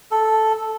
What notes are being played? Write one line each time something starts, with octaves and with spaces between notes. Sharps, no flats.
A4